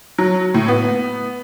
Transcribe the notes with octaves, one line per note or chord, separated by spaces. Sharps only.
F#3
A2
B3